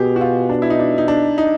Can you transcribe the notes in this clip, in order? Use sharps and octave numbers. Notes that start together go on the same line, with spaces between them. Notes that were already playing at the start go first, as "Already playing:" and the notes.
Already playing: B2 G4 G#4
F#4
F4
D4
E4
D#4
D4
D#4
D4
D#4